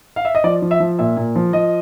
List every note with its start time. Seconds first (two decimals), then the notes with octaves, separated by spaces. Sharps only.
0.16 F5
0.25 E5
0.35 D#5
0.44 F3 D5
0.62 F3
0.71 E5
0.80 F3
0.99 A#2 E5
1.17 A#2
1.35 F3
1.53 F3 D#5